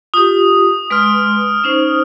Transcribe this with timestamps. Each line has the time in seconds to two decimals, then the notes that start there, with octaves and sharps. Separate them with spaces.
0.14 F4 G4 D#6
0.90 G#3 B4 C6 F6 D7
1.64 C#4 D#4 C5